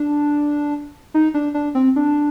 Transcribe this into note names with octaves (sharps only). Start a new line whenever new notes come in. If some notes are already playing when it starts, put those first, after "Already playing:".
Already playing: D4
D#4
D4
D4
C4
D4